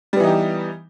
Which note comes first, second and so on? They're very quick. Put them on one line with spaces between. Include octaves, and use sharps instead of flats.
G3 B3 E3 D#4 G4